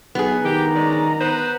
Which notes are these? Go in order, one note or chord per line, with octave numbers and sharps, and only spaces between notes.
B1 B3 G#4
D#3 G4 A#5
G#3 C#4 D5
B3 B4 C5